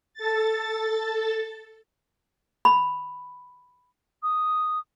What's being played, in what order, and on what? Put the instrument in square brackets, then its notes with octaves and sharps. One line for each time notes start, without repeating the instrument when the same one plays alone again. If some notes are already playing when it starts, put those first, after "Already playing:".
[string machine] A4 A6
[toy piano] B5
[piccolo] D#6